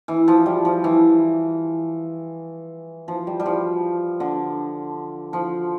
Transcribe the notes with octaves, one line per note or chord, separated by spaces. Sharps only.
E3
F3
G3
F3
E3
F3
G3
G3
F3
D3
F3